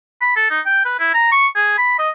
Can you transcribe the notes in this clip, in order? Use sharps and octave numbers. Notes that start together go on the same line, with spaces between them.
B5
A4
D#4
G5
B4
E4
A#5
C#6
G#4
B5
D#5